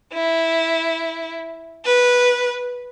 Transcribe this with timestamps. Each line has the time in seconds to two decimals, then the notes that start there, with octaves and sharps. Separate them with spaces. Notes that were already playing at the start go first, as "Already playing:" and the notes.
0.13 E4
1.85 B4